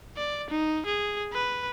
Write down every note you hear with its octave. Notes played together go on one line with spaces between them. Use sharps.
D5
D#4
G#4
B4